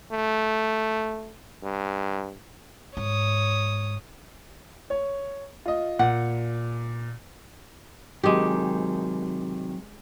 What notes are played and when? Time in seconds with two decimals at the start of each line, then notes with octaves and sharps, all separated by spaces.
0.11 A3
1.63 G2
2.97 G#2 C#5 D#6
4.90 C#5
5.66 F4 D#5
5.99 A#2 F#5
8.24 C3 D#3 F#3 G#3 G4